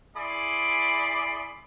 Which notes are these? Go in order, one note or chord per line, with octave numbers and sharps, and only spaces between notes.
E4 G#4 D5 B5 C6 D6